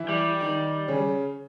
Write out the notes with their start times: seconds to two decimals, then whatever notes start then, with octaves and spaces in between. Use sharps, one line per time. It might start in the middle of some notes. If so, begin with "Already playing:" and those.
Already playing: E3 E4
0.09 G3
0.41 D#3 D#4
0.88 C#3 C#4